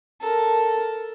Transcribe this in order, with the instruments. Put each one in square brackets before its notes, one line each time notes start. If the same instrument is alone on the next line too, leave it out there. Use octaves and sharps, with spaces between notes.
[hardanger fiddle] A4 A#4